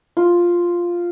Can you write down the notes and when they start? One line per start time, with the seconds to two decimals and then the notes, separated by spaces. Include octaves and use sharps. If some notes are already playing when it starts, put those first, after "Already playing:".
0.17 F4